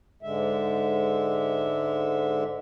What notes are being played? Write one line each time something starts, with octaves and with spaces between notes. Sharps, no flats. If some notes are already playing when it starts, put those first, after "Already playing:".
G#2 D3 G#3 E5